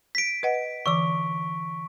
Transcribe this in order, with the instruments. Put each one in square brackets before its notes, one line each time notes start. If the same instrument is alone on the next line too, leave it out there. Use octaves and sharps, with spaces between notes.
[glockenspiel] B6 D7
[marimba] B4 D#5 F#5
[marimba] D3 E3 D6 [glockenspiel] C#6